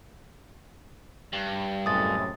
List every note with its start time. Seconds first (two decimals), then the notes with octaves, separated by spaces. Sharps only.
1.33 G2
1.86 F#2 A2 C3 G#3 D#6 A6